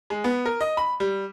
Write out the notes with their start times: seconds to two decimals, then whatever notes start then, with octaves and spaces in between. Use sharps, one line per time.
0.10 G#3
0.24 B3
0.45 A#4
0.61 D#5
0.77 B5
1.00 G3